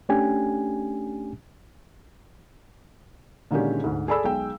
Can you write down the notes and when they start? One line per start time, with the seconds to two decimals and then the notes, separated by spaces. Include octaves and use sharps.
0.09 A3 C#4 D4 G4 G#5
3.51 A#2 D3 D#3 G#3 C#4 G4
3.84 D2 G#2
4.08 G#4 A4 D5 B5 E6
4.24 B1 G#3 G5